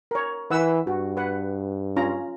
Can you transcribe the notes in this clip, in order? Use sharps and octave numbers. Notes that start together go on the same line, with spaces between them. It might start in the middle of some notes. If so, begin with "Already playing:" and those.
A#4 C#5
E3 B4 F#5 E6
G2 F#4
B4 F#5
C#4 F4 A#5